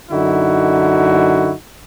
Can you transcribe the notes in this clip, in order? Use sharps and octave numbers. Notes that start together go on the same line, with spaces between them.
F#2 D3 D#4 E4 F#4